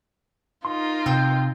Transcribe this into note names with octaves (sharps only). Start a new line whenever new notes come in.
D#4 F4 A#4 C6
C3 C4 G5 E6